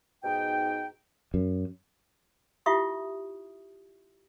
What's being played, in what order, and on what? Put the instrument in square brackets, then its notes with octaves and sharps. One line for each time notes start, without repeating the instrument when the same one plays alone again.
[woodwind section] G#2 B2 D#4 G5
[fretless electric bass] F#2
[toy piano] E4 F4 G4 E5 C#6 D#6